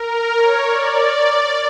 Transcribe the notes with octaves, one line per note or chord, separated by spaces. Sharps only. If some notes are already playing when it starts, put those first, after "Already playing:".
Already playing: A#4
C#5
D5